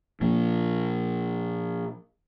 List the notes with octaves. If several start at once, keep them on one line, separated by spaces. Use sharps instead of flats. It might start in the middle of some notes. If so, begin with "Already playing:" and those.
A#2 F3